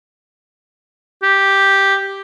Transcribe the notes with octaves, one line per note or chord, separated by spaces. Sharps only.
G4